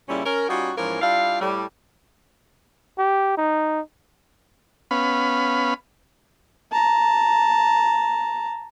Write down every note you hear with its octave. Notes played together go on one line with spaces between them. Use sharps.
A#2 C#3 G3 C#4 E4
C#4 A#4
G3 C#4 D#4 F4 F#4
G#2 E3 F3 C#4 F4 A#4
G3 D4 E4 F4 F5
A2 G3
G4
D#4
B3 C#4 F5 B5
A5 A#5